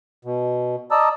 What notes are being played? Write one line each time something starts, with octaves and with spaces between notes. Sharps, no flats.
B2
D5 D#5 A5 A#5 E6